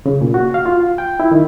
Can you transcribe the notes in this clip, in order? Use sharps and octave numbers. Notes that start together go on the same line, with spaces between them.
C#3
A#2
F#4
F5
F4
G5
E4
D#3